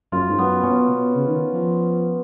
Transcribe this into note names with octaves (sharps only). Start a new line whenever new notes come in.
F#2 F4
G#2
F#2 B3
B2 C#4
B2
C#3
D#3
F3